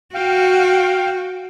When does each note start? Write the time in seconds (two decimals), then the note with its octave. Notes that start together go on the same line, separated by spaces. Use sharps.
0.15 F#4 F5 G5